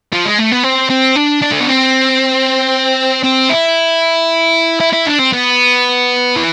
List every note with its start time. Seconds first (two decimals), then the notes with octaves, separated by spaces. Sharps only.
0.13 F3
0.26 G#3
0.38 A3
0.52 B3
0.64 C4
0.90 C4
1.16 D4
1.42 D4
1.52 A3
1.60 B3
1.68 C4
3.23 C4
3.50 E4
4.80 E4
4.93 E4
5.06 D4
5.19 C4
5.33 B3
6.36 E3